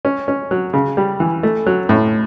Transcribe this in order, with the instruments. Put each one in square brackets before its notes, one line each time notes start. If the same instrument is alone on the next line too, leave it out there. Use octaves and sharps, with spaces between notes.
[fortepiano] C#4
C#4
F#3
C#3
G3
E3
A3
F#3
A2